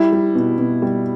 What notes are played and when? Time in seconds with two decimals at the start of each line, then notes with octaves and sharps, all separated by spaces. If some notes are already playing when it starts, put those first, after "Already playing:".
Already playing: G3 E4
0.12 G3
0.35 B2
0.59 B2
0.82 G3